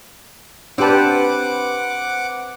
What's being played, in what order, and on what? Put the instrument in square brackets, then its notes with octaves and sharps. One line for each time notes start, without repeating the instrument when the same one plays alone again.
[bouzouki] C4 B4 [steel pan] D4 G4 A5 [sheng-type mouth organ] F#5 D6